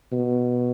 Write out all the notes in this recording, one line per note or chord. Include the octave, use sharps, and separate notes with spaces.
B2